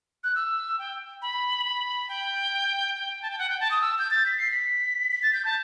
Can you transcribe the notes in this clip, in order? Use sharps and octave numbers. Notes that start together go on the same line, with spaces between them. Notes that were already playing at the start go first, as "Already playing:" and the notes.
F#6
E6
G5
B5
G5
G5
A5
G5
F#5
G5
A5
D#6
E6
G6
A6
B6
C7
B6
B6
A6
G6
A5